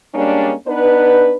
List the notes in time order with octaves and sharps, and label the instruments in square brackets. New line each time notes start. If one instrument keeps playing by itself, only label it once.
[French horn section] G3 G#3 A#3 C#4 D4
B3 D4 D#4 B4